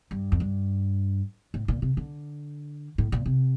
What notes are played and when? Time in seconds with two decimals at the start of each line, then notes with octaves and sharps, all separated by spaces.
0.11 G2
0.32 F2
0.40 G2
1.54 A2
1.68 A#2
1.82 C3
1.97 D3
2.98 A2
3.12 A#2
3.26 C3